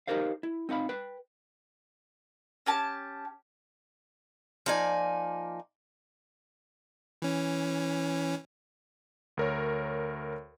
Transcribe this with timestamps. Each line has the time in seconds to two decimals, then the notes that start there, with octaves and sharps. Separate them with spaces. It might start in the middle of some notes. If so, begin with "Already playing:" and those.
0.07 D#4 E4 G4 A#4 C5 F5
0.43 E4
0.69 C4 D#4 F5 B5
0.89 B4 G5
2.66 C#4 G4 A5
4.66 F3 A#3 D#4 D5 G#5
7.22 E3 C#4
9.37 D2 A#4 C#5